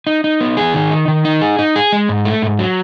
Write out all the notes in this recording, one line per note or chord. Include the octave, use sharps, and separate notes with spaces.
D#4
D#4
B3
G#4
D#3
D#4
D#3
D#4
G#4
D#4
G#4
G#3
G#2
A3
G#2
F#3